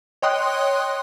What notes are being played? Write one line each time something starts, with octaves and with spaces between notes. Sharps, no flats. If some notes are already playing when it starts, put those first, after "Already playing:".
C#5 D#5 G5 C6 D#6 F#6